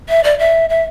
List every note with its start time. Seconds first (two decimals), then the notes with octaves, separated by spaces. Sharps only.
0.09 E5
0.24 D5
0.39 E5
0.70 E5